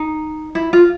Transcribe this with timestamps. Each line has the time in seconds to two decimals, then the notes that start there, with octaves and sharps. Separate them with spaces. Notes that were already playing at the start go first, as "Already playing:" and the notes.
Already playing: D#4
0.55 E4
0.73 F4